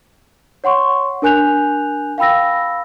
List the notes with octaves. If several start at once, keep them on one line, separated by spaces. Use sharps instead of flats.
C#5 F#5 C6 C#6
D4 A#4 G#5 F#6 G6 F7
F5 G5 B5 E6 A#6